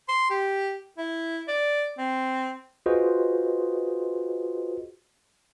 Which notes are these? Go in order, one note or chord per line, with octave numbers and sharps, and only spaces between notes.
C6
G4
E4
D5
C4
F4 F#4 G#4 B4 C5 D#5